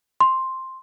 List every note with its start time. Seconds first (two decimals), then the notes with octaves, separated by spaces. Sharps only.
0.21 C6